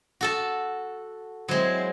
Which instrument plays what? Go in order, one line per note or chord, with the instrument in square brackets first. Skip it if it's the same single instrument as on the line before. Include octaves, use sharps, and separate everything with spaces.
[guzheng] F#4 A4 A5
[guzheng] F#3 G#3 [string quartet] C4 E4 C5